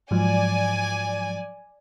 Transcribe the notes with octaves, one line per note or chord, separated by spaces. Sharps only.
G#2 F3 F#3 D5 G#5